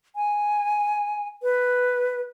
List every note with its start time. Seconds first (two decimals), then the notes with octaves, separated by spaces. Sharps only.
0.16 G#5
1.43 B4